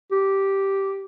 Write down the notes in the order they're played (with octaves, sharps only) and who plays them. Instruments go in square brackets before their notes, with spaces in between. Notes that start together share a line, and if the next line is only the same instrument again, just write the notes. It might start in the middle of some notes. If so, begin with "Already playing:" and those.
[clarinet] G4